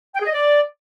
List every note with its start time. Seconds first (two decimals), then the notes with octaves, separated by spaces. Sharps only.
0.15 G5
0.21 G#4
0.27 D#5
0.33 D5